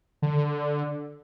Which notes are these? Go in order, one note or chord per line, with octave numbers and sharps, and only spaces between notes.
D3